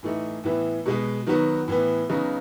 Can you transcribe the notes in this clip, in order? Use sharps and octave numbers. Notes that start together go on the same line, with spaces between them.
A2 E3 A3 D#4
A2 E3 B3 E4
B2 G#3 B3
D#3 F#3 B3 F#4
A2 E3 B3
C#3 F#3 B3 D#4 F#4